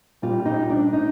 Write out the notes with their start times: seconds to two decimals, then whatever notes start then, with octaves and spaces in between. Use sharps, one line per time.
0.22 A#2 G3 A#3 F4
0.45 D#4
0.70 D4
0.93 D#4